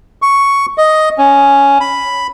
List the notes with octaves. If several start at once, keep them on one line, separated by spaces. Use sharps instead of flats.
C#6
D#5
C#4
B5